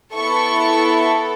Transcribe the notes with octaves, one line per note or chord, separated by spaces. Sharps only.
B3 E4 A4 C#6